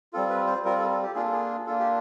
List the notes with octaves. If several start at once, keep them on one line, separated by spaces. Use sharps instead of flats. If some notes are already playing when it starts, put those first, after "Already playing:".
G3 C4 F4 A4
B4
C5
G3 C4 F4 A#4
A4
A4
G4
A#3 D4 F4 G#4
A4
G#4
A#3 D4 F4 A4
G4